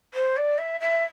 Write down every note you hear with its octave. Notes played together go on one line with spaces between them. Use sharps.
C5
D5
E5
E5